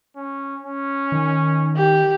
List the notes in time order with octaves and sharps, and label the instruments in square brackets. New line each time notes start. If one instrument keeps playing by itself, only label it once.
[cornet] C#4
C#4
[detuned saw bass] D#3
[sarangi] G4